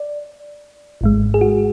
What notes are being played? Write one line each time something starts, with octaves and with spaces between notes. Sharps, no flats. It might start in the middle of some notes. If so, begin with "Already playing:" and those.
Already playing: D5
G#1 G#2 G#3
G#4
F#4